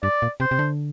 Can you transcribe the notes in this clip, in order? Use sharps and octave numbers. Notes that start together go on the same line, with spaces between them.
G2 D5
A#2
C3 C5
C3
D3